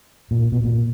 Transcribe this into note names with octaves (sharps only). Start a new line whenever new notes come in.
A#2
B2
A#2